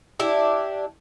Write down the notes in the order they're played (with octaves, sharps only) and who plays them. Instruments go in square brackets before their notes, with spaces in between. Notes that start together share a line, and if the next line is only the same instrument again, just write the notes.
[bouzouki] D4 E4 G4